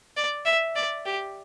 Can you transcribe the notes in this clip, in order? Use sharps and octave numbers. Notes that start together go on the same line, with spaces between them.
D5
E5
D5
G4